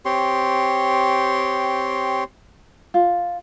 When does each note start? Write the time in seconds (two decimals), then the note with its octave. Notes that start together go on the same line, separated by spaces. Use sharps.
0.05 C4 G4 C#5 C6
2.94 F4